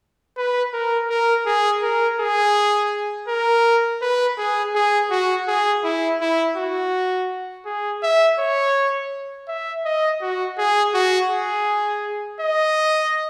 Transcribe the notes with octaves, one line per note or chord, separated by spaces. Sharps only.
B4
A#4
A#4
G#4
A#4
G#4
A#4
B4
G#4
G#4
F#4
G#4
E4
E4
F#4
G#4
E5
C#5
E5
D#5
F#4
G#4
F#4
G#4
D#5